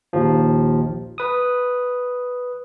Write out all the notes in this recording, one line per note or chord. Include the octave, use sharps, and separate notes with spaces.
A#1 D#2 F3
B4 D#6